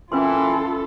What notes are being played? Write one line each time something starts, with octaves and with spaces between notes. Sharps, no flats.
A#2 E3 C#4 F4 A4 B4 C6